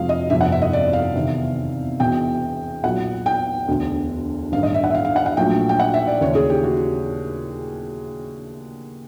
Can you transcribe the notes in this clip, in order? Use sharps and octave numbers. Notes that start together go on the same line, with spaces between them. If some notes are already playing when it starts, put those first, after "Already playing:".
Already playing: F2 C3 F3 G#3 F5
D#5
G1 F2 C3 E5
F#5
E5
D#5
D5
F5
E2 C3 D#3
E1 E2 B2 G5
B1 A#2 F#3 F#5
G5
E1 D2 D3
A1 G2 D#3 F5
D#5
E5
F#5
E5
F5
F5
F#5
F#5
A#1 A#2 F#3 A3 G5
G5
F#5
E5
D5
D#2 C#3 E3 C#5
G#4
G4
F#4